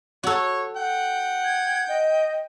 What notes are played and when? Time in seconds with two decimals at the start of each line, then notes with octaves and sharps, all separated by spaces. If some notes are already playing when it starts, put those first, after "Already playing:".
0.23 F#4 A4 C#5
0.76 F#5 G5
1.44 G#6
1.88 D#5